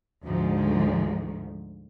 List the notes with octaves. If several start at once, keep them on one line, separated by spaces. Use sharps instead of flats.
D2 G#2 F3